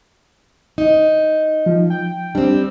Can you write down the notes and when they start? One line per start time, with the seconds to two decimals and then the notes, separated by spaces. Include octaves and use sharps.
0.78 D#4
1.66 F3
1.90 G5
2.35 G3 C4 D4